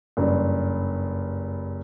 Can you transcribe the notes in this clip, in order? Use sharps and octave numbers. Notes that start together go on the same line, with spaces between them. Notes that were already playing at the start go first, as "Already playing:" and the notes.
F#1 G2